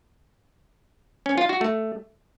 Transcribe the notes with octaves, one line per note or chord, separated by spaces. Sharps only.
C#4
F4
F#4
A3